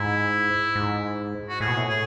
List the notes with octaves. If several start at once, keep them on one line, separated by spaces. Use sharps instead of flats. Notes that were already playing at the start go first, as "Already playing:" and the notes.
Already playing: G#2 E4
G#2
F#4
A2 G#4
B2
A2
G#4